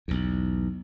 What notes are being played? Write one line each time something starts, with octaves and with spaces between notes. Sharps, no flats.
B1 E2